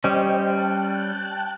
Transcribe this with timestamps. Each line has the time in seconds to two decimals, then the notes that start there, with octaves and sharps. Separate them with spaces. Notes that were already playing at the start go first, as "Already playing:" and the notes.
0.04 G3 C#4 C5 D#5 G5
0.58 G5 A5 F#6